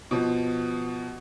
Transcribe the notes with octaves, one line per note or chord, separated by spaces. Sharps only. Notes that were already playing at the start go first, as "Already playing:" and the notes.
B2 F3